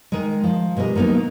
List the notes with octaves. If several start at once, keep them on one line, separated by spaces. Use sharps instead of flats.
D#3 G#3
F3
B2 G#3 G4 A#4 D#5
D#3 F#3 A#3 B3 D#4